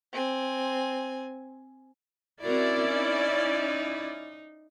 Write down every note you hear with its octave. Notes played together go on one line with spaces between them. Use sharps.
C4 G#5
C4 C#4 E4 F#4 A#4 D5
D#4